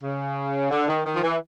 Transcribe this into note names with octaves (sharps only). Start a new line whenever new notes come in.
C#3
D3
D#3
D#3
F3
E3